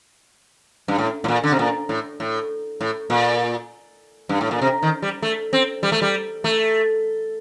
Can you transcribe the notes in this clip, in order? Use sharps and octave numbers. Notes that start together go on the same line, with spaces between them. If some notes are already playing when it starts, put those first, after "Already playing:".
G2
A2
A2
A#2
D3
C3
A#2
A2
A2
A2
A#2
G2
A2
A#2
C3
D#3
G3
A3
C4
G3
A3
G3
A3